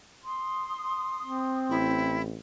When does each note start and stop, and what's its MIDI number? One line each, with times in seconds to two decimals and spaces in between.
0.23 1.76 84
0.23 1.76 87
1.22 2.36 60
1.70 2.41 33
1.70 2.21 64